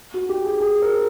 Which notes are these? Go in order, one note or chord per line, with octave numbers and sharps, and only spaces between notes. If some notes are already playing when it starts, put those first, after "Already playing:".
F#4
G4
G#4
G#4
A#4